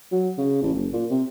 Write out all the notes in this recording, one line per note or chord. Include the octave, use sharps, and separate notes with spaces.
F#3
C#3
A1
F#1
A#2
C3